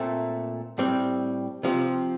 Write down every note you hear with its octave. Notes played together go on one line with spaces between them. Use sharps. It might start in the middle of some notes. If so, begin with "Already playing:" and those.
Already playing: A#2 A3 C4
A2 G3 C4
C3 F3 C4 F4